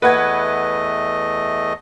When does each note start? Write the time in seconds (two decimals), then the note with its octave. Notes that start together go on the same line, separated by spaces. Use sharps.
0.02 E2 A3 B4 D#5 F#5 G#6